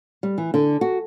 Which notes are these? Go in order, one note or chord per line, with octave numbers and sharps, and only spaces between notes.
G3
E3
D3
F#4